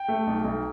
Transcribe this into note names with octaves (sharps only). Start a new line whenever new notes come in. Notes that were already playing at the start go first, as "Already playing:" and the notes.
Already playing: G5
A3
B1
B1